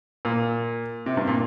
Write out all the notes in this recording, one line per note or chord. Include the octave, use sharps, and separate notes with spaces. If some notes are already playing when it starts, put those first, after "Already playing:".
A#2
C3
G2
A#2